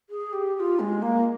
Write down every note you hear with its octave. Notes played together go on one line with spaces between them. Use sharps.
G#4
G4
G4
F4
G#3
A#3